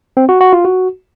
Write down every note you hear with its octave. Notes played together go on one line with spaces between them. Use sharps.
C4
F#4
F#4
F4
F#4